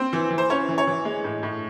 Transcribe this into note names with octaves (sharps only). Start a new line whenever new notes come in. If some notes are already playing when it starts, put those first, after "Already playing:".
Already playing: C4 C5
E3
E3
C5
C#4 C#5
E3
C#5
E3
G#3
A2
A2